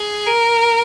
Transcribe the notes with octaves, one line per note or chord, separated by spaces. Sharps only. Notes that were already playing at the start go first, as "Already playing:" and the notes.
Already playing: G#4
A#4